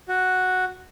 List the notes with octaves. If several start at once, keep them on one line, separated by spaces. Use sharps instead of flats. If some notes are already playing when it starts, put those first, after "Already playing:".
F#4